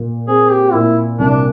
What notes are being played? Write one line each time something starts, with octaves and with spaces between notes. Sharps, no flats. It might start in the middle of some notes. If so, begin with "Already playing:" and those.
Already playing: A#2
C4 G#4
G4
A#2 E4
C2 D4